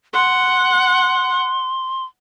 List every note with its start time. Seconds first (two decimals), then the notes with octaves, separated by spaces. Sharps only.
0.14 F#5 C6